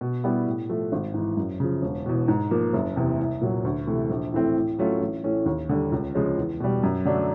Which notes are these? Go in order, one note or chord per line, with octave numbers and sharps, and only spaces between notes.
B2
G3 B3 E4 G4
A2
F3 A3
G#1
G#2 E3
F#2
C#3 F3
E1
E2 B2
G#2
F3 A#3
F#1
E2 C3
C2
A#2 F#3
D2
C3 E3 A3
A#1
A2 E3 A3 C4
A2
F#3 A3 C#4 F4
A1
A2 E3 A3 C#4
D#2
D3 G3
C#2
C#3 F3 G#3 C#4
E2
B2 G3
F#2
D3 F#3 A3 D4